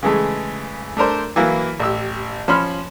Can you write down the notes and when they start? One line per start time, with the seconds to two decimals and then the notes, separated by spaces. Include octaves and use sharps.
0.03 C#3 E3 G#3 A3
0.97 A3 D4 A#4 C5
1.36 E3 F#3 A#3 E4 A#4
1.79 A1 G4 E6
2.48 F3 C#4 B5 C6 F6